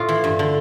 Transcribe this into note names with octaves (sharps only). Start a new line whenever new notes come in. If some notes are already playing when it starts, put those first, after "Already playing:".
Already playing: A2 F4
E3
G2
D3